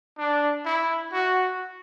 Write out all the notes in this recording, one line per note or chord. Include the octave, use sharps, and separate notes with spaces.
D4
E4
F#4